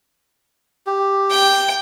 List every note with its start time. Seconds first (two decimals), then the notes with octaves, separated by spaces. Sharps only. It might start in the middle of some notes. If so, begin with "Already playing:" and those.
0.87 G4
1.30 G5